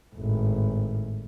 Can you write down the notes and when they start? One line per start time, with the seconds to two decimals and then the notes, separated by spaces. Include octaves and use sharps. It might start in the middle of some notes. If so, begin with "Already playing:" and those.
0.15 G#1 A2